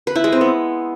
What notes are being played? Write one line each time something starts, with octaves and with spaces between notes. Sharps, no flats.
B4
E4
G#3
C4
B3